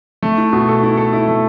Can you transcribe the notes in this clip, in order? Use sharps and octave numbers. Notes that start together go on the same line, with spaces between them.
A3
E4
B2
A4
E4
A4
E4
A3